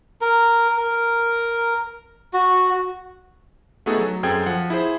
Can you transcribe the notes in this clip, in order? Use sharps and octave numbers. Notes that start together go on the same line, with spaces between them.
A#4
A#4
F#4
A3 B3 D#4 F#4 G#4 A4
F#3
F#2 C4 G#4 A4 G5 G#6
F3 F#5
E4 G#4 C5